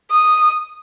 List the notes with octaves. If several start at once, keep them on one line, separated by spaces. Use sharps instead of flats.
D#6